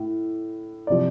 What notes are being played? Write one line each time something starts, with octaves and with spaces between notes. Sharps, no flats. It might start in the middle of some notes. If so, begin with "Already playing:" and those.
Already playing: A2
C3 F3 D5